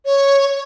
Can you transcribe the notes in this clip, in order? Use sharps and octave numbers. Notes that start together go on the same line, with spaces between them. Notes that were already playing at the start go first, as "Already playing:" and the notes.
C#5